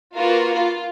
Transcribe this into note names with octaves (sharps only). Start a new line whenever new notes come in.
A#3 F4 F#4 A#4 B4
F4